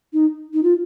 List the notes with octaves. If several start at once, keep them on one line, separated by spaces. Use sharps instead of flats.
D#4
D#4
F4